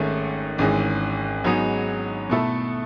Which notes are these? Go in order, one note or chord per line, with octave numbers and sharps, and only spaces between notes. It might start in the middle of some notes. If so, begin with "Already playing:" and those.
Already playing: G#1 G#2 D#3 A3 C#4
G#1 G#2 E3 G#3 C#4
G#2 F#3 B3 D#4 G#4
B2 A3 E4 A4